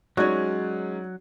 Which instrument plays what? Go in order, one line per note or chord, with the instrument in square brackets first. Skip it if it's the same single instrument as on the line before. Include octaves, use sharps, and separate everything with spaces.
[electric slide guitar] F#3 [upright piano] G#3 C#4 [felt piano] D#4 D5 G#6 [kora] F#4